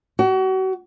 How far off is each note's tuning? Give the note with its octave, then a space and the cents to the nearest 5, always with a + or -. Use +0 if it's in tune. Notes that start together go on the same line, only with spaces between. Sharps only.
F#4 +35